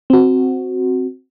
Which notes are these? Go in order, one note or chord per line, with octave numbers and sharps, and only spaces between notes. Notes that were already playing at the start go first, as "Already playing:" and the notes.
C4 F#4